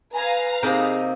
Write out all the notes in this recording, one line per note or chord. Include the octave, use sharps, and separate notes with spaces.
B4 F5 G#5 A#5
C3 A#3 D#4 G#4 B5